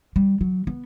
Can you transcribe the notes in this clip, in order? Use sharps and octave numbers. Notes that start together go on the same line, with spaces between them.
G3
F#3
B3